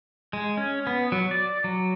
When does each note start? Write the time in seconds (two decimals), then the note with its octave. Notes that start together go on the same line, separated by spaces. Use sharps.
0.33 G#3
0.57 C#4
0.87 B3
1.12 F#3
1.31 D5
1.64 F#3